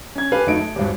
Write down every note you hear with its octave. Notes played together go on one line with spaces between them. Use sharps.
C#4 G#6
G4 A4 B4 F5 G#5
F#2 A3 D#4 D7
A3
D#1 G#1 G2